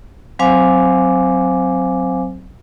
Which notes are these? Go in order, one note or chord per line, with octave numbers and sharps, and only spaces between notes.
F#3 C4 C5 F5 G#5 D6